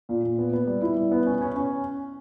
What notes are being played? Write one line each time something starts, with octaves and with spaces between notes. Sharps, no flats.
A#2
A#2
B3
B3
G3
E4
G3
B3
C#4
C#4
C#4